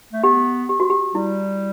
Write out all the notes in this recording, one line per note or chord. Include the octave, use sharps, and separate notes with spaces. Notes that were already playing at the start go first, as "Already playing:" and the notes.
A3
B3 G4
G4
F#4
G4
G3 E4